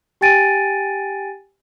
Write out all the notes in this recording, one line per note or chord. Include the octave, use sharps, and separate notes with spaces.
G4 G5 G#5 A6 D7 D#7